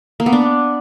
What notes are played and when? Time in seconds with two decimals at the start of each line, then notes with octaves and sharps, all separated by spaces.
0.20 A#3
0.26 B3
0.33 D4